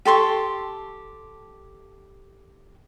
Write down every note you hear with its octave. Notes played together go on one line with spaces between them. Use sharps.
G4 A4 C6 C#6